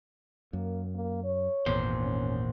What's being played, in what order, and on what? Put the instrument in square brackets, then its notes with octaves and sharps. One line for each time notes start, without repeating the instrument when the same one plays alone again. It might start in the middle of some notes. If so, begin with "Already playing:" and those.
[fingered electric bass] F#2 [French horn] A#3
[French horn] A#3
C#5
[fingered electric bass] G#1 E2 [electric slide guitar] A#2 C5
[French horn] C#4